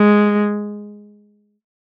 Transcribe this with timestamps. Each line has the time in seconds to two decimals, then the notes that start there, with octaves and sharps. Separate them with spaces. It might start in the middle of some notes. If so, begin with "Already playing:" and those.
Already playing: G#3